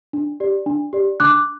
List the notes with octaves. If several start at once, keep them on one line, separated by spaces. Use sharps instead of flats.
D4
G4 D5
D4
G4 D5
D4 D6 F#6